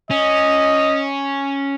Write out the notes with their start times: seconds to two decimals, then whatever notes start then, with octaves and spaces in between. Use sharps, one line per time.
0.11 C#4 D#5